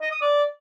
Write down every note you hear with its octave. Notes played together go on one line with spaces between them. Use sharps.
D#5
D#6
D5